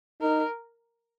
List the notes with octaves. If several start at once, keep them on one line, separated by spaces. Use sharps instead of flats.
D#4 A#4